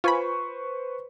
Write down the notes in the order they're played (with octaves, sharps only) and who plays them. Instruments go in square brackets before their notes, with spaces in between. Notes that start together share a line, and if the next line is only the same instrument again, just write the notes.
[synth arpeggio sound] F4 G#5 B5 [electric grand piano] B4 C5 C#6